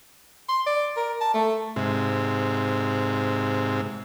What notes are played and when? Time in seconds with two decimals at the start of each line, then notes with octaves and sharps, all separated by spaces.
0.49 C6
0.67 D5
0.97 A#4
1.21 A5
1.34 A3
1.76 G#2 C3